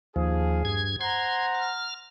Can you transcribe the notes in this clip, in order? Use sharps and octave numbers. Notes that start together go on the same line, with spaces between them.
D#2 F3 G#4
G2 G#6
C5 F#5 A#5 C6 G#6
F6